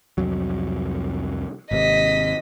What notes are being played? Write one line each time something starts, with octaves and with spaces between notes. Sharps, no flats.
C2 F2 F#3
G#1 C3 D#5 B6